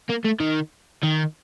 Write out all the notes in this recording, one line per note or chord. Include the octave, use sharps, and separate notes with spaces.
A#3
A3
D#3
D#3